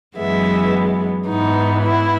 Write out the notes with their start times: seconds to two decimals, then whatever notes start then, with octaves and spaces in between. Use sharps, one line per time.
0.18 F#2 E3 G#3 B3 E5
1.28 G#2 E3 B3 D#4
1.82 E4